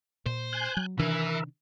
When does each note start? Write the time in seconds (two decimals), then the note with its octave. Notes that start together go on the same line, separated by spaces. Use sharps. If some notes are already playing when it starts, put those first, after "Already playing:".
0.26 A#2 C5
0.53 G#5 F#6 G6
0.77 F#3
0.99 C3 D#3 E3 D4 A#4 E5